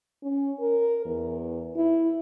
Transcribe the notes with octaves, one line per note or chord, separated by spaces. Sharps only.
C#4
A#4
E2
E4